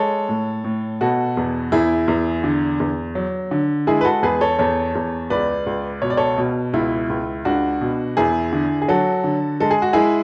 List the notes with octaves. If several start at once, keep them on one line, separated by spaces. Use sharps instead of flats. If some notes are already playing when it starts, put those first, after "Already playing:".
Already playing: G#3 A4 C#5
A2
A2
B2 F#4 A4
E2
E2 E4 G#4
E2
D3
E2
F#3
D3
G#3 E4 G#4
B4
F#4 A4
E2 G#4 B4
A4 C#5
E2 A4 C#5
E2
C#2 B4 D5
C#2
B2 C#5
D5
A4 C#5
B2
C#2 E4
C#2
C#2 D4 F#4
B2
E2 E4 G#4
D3
G#4
F#3 F#4 A4
D3
G#3 A4
G#4
F#4
G#3 E4 G#4